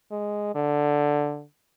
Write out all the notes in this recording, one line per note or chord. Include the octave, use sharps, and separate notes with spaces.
G#3
D3